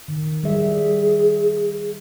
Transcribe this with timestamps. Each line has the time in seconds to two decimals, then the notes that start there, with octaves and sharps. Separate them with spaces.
0.08 D#3
0.43 G3 G#4 E5